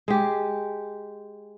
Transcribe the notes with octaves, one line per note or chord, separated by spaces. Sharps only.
G#3 G4